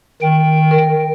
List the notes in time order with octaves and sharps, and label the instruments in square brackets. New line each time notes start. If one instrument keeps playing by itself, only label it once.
[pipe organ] D#3 G5
[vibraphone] A#4